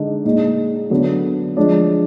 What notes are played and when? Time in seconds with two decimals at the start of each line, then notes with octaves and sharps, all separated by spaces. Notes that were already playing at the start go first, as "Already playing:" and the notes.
Already playing: D3 G#3 D#4
0.25 A#2 G#3 D#4
0.90 D3 F#3 B3
1.57 F3 G#3 D4